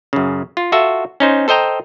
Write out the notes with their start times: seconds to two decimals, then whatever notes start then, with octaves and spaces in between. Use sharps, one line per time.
0.13 F#2 C#3
0.57 F4
0.72 F4 F#4 A4 E5
1.20 C#4 D#4 C5
1.48 A4 C5 D#5 G5 A#5